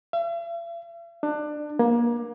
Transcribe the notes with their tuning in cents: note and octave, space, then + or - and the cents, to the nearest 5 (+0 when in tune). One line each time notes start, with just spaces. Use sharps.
E5 +45
D4 +25
A#3 +25